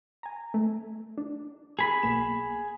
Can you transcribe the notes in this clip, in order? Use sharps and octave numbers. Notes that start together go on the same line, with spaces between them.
G#5 A#5
A3
D4
G#4 A#5 B5 C7
B1 A#3 E7